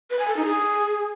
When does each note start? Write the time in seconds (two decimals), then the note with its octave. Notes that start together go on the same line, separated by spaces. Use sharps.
0.10 B4
0.19 G#5
0.28 A4
0.37 D#4
0.45 G#4